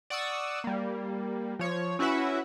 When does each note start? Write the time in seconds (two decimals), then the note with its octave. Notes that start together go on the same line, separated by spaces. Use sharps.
0.10 D5 F#5 C#6 D#6 E6
0.64 G3 A#3
1.59 F3 C#5
1.99 C#4 E4 F#4 B4 E5 F#5